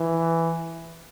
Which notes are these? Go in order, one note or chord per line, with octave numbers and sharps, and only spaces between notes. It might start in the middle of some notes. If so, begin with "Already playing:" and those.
Already playing: E3